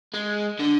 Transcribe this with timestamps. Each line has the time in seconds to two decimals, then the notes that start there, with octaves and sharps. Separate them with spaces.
0.14 G#3
0.60 D3